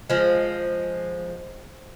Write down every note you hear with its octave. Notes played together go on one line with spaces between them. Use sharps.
F3 G#3